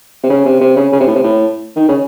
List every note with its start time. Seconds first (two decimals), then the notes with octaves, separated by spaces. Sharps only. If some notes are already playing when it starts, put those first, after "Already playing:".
0.23 C3
0.30 C#3
0.45 C3
0.61 C3
0.76 C#3
0.92 C#3
1.00 C3
1.07 A2
1.15 C3
1.24 A2
1.76 D#3
1.88 C#3